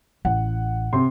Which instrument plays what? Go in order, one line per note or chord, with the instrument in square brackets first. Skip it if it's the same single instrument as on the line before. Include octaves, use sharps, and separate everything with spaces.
[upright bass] A1 [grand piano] F#5
[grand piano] C3 C6